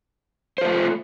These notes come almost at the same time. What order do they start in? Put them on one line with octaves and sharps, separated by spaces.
C5 F4 A3